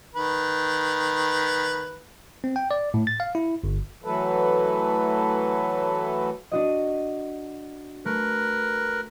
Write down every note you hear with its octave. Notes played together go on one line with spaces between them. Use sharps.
D#3 B4
C4
G5
D5
A2
A6
F5
E4
G1
E3 F#3 A3 A4 B4
D4 F#4 D#5
A3 A#4 B4